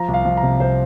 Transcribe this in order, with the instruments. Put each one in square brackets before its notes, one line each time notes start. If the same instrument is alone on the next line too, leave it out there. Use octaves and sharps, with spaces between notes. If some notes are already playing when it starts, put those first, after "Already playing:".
Already playing: [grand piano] F3 A#5
C2
F5
F3
A#5
C3
C2 C5